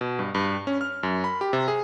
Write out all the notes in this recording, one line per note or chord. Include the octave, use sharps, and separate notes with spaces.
B2
G2
G2
C#4
F6
F#2
B5
G4
C3
G#4